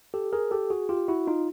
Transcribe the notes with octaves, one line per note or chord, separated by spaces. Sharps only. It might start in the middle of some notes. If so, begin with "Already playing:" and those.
G4 A4
G#4 A#4
G4 A4
F#4 G#4
F4 G4
E4 F#4
D#4 F4